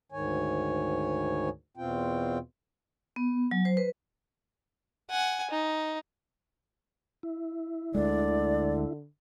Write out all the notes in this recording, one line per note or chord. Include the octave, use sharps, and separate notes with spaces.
D2 G#2 D#3 C#5 G#5
E2 B2 C4 F4 G5
B3
F#3
C5
B4
F#5 G#5
D#4
E4
D2 D3 G#3 D5